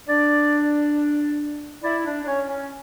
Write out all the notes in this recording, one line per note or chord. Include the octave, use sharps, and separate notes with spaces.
D4 D5
E4 D5
D4
D4
C#4 C#5
C#4